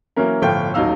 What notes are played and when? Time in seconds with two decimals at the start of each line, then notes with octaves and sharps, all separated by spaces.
0.16 E3 F#3 A#3 C#4 A#4
0.42 G1 A2 F3 F4 G5
0.74 D#1 A1 F#3 D#4 F5 E6